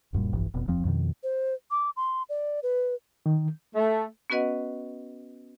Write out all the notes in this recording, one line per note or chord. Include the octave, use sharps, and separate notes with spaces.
D1 F#2 A#2 G3
F1 A#1 G2 E3
F1 B2
D#1 F2 F3 C4
F2 B2 D#3
C5
D6
C6
D5
B4
D#3
A3
B3 C#4 F#4 B4 D#5 F#5